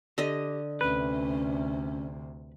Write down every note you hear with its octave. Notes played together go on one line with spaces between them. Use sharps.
D3 G4 D#5
D2 C3 C#4 B4